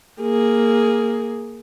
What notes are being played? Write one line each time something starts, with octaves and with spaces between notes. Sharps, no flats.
A#3 G#4